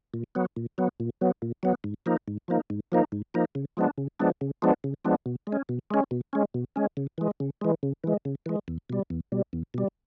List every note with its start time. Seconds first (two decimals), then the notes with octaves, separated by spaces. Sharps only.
0.14 A#2
0.35 F#3 B3
0.56 A#2
0.78 F#3 B3
1.00 A#2
1.21 F#3 B3
1.42 A#2
1.63 F#3 B3
1.84 G#2
2.06 F3 A#3 D#4
2.28 G#2
2.48 F3 A#3 D#4
2.70 G#2
2.92 F3 A#3 D#4
3.12 G#2
3.34 F3 A#3 D#4
3.55 C#3
3.77 F3 G#3 B3 D4
3.98 C#3
4.20 F3 G#3 B3 D4
4.41 C#3
4.62 F3 G#3 B3 D4
4.84 C#3
5.05 F3 G#3 B3 D4
5.26 B2
5.47 G#3
5.52 C#4
5.69 B2
5.91 G#3 C#4
6.11 B2
6.33 G#3 C#4
6.54 B2
6.76 G#3 C#4
6.97 C#3
7.18 E3 G#3
7.40 C#3
7.61 E3 G#3
7.83 C#3
8.04 E3 G#3
8.25 C#3
8.46 E3 G#3
8.68 E2
8.90 B2 G3
9.10 E2
9.32 B2 G3
9.53 E2
9.74 B2 G3